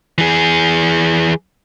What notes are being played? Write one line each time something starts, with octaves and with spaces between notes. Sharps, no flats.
E3 G#4